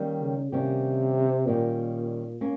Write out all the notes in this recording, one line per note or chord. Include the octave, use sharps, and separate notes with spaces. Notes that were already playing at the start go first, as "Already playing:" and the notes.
Already playing: D#3 G3 A#3 C#4 G4
C#3
C3 D#3 G3 A#3 C#4 G4
A#2 D#3 G3 A#3 C#4 G4
A#3 C#4